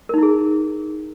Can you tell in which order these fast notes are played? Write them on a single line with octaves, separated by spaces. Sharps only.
A#4 D#4 E4 G#4